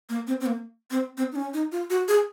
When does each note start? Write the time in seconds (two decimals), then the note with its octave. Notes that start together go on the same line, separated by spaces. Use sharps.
0.09 A#3
0.27 C4
0.40 C4
0.46 A#3
0.91 C4
1.17 C4
1.32 D#4
1.36 C#4
1.53 D#4
1.72 F4
1.90 F#4
2.08 G#4